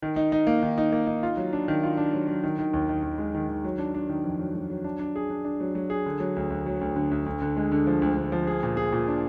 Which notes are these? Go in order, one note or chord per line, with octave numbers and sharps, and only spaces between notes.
D#3
D#4
D#4
A#3
D#3
D#4
A#3
D#4
F4
F#3
D4
D#3
F4
D4
F#3
F#3
D#3
D#3
D#2
D#3
D#2
G#3
D#3
D#3
F#3
D4
D4
D#3
F2
F#3
F#3
F#3
D4
D4
G#4
D4
D4
F#3
F#3
G#4
D3
F#3
D2
D2
F#3
D2
D3
D2
D2
D3
G#3
D3
F3
D2
D2
F3
G#4
A#2
G#4
A#2
D4